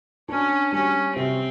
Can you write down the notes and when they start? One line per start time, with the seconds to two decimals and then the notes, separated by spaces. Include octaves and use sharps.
0.29 C#4 D4
0.72 G3 C#4
1.16 C3 C4